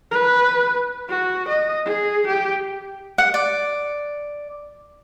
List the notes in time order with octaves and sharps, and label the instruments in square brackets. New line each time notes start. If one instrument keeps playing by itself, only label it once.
[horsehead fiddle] B4
F#4
D#5
G#4
G4
[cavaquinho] F#5
D5